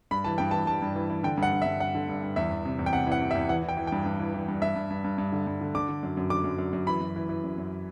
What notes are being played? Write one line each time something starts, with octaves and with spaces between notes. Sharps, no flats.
G2 B5
E3 A5
G2 G5
E3 A5
G2 A5
G2
E3
E3
D3 G5
G2
F#5
G2
E5
G2
G2 F#5
D3
G2
G2
E2 E5
E2
C3
E2
G5
C3 F#5
E3
F#5
C3
E5
E2
E3 F#5
E3
G5
E3
G2 G5
G2
E3
E3
G2
G2 E5
G2
G2
G2
G2
D3
G2
D3
D3 D6
D3
F#2
F#2
D3 D6
F#2
F#2
F#2
E3 B5
F#2
E3
E3
F#2
F#2